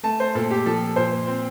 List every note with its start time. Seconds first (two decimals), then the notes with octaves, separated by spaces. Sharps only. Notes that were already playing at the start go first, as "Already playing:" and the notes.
0.03 A3 A5
0.20 C5
0.35 A#2 A4
0.51 G4
0.66 F3 A4
0.96 A#2 C5
1.27 C4